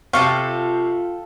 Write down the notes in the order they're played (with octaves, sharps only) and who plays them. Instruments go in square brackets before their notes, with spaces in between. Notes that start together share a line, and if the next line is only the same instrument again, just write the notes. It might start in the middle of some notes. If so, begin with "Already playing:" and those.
[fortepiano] C3 F5 C#6 [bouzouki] F4 A4 G5